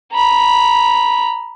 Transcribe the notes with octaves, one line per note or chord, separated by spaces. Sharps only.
A#5 B5